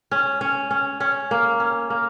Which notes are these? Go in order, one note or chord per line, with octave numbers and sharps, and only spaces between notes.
C#4
C#4
C#4
C#4
A#3
C#4
A#3